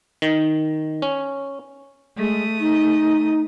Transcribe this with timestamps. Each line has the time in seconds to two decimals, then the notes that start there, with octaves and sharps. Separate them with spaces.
0.22 D#3
1.02 C#4
2.17 G#3 A3 D#6
2.60 D#4